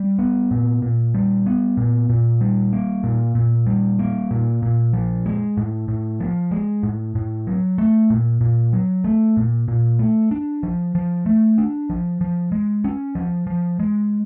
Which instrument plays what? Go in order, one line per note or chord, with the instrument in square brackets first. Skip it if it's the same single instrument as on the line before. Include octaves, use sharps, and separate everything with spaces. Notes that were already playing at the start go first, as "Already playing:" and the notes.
Already playing: [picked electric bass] G3
B3
A#2
A#2
G3
B3
A#2
A#2
G3
A#3
A#2
A#2
G3
A#3
A#2
A#2
F3
G#3
A2
A2
F3
G#3
A2
A2
F#3
A3
A#2
A#2
F#3
A3
A#2
A#2
A3
D4
F3
F3
A3
D4
F3
F3
G#3
C#4
F3
F3
G#3